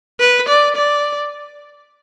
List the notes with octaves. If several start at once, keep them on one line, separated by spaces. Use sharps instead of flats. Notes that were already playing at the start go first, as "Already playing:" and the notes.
B4
D5
D5